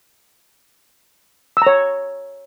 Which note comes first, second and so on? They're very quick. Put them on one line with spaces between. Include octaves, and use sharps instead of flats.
E6 A#5 C#5